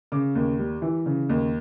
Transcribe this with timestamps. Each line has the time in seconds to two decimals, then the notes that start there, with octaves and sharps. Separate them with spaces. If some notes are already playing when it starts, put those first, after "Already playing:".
0.12 C#3 D6
0.35 D#2
0.59 G3
0.82 E3
1.06 C#3
1.29 D#2